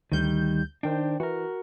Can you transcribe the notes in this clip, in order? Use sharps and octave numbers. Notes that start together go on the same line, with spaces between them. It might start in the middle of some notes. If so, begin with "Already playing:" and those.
D2 D#3 G3 G6
D#3 D4 C5 G5
E3 F#4 A#4